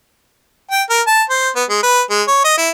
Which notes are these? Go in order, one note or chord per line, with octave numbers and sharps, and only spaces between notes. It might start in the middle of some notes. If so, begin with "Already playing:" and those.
G5
A#4
A5
C5
B3
G#3
B4
G#3
C#5
D#5
E4